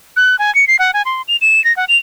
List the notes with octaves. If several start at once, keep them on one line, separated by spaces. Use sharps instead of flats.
F#6
G#5
C#7
C7
F#5
G#5
C6
F7
E7
A#6
F#5
F7